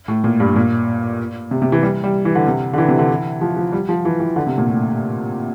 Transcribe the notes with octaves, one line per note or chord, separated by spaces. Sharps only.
A2
A#2
G2
A#2
C3
C3
E3
G3
G3
E3
D3
C3
D3
E3
C3
D3
E3
F3
F3
G3
F3
E3
E3
D3
C3
A#2
A2